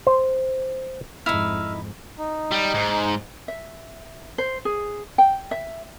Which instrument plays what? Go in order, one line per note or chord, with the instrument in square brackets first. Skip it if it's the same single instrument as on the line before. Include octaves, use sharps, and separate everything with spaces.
[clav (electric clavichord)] C5
[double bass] F2 G#2 [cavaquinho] D#4 E4 [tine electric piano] E6 F6
[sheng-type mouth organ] D#4
[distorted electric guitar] G3
G#2
[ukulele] E5
C5
G#4
G5
E5